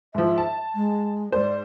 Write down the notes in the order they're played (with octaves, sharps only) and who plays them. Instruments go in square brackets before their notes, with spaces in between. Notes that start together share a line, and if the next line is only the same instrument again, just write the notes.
[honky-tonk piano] G#2 F3 [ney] E5
[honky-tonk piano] A5
[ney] G#3
[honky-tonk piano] G#2 C5 [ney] D5